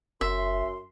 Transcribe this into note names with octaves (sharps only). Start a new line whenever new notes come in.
F#1 F#2 E5 C6